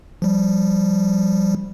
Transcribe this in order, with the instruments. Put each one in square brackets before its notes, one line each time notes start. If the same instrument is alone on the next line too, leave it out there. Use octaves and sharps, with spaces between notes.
[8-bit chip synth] F3 G3